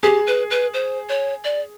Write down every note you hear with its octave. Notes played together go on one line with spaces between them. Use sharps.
G4 G#4
B4
B4
C5
C#5
D5